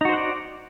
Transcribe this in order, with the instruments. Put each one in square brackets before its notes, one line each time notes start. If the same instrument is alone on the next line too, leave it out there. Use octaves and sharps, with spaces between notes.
[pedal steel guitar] D#4
F#4
C5
F#5
D5